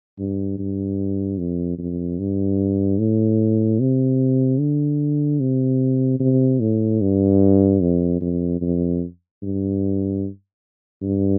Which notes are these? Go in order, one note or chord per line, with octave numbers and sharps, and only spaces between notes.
G2
G2
F2
F2
G2
A2
C3
D3
C3
C3
A2
G2
F2
F2
F2
G2
G2